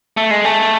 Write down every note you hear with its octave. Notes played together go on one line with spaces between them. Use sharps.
A3
G#3
A3